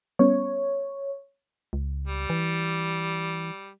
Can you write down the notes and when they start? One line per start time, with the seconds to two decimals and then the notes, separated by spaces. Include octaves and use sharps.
0.19 G3 B3 C#4 C#5
1.73 C#2
2.07 G3
2.30 E3